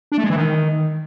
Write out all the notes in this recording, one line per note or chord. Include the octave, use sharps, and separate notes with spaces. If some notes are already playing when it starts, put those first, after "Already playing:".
D4
A3
G#3
E3
D#3